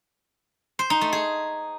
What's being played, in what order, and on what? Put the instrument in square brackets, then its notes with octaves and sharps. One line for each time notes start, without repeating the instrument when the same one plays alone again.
[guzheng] C5
D#4
A3
G#4